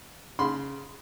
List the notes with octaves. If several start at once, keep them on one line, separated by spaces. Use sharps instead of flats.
C#3 B5 C6